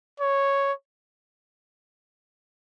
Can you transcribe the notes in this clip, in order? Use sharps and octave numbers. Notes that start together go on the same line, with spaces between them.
C#5